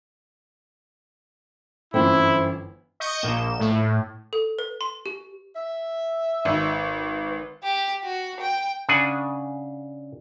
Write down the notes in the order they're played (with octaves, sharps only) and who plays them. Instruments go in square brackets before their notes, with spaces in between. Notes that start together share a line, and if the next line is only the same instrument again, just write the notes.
[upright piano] G1 F#2 E3 [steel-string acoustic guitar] C4 [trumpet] E4
[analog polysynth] D#5 C#6 G6
A#1 A#3 E7
A2
[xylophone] A4
B4
C6
G4
[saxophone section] E5
[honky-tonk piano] G#1 [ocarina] B4
[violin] G4
F#4
G5
[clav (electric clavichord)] C#3 D4 F#5 G#5